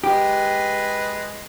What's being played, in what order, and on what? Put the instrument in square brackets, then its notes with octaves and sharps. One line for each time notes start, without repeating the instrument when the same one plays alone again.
[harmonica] G#3 B4 [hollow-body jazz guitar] G4